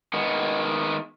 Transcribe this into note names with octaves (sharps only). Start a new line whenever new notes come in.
D#3 G#3 B3